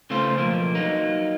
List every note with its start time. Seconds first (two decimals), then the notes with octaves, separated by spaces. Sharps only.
0.10 C#3 A3 F4 C5
0.38 B1 F3 A#3
0.75 F#3 A#3 D#4